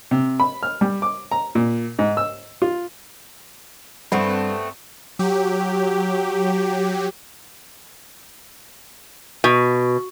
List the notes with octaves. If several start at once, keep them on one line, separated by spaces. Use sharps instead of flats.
C3
B5
F6
G3
D6
A#5
A#2
G#2
E6
F4
G2 A3 B3 C4
F#3 G4
B2